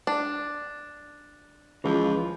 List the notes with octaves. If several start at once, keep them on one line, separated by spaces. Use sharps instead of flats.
D4
C#2 E3 F3